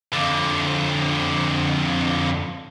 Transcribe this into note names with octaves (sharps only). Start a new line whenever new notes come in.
F2 D3